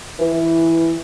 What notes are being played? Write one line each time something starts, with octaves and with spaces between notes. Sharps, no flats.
E3